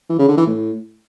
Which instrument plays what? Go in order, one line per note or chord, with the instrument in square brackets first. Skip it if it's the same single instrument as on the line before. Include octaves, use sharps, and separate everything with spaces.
[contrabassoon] E3
C#3
D3
E3
A2